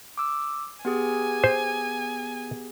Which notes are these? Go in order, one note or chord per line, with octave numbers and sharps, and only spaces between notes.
D6 E6
B3 G4 G#4 G#5
C5